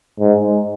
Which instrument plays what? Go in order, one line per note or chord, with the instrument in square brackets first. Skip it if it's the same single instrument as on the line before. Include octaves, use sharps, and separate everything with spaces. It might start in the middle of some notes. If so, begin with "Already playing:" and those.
[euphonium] G#2